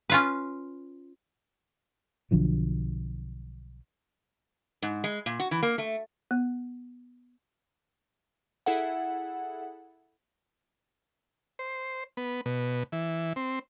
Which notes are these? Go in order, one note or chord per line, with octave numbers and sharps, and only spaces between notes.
C#4 F4 B4
B1 D3 F3 F#3
G#2
G#3
A#2
F#4
E3
A#3
A3
B3
E4 G#4 A4 E5 F#5
C5
B3
B2
E3
C4